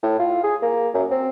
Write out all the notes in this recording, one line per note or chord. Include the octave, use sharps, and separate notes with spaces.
A2
F4
G#4
A#3
F#2
C4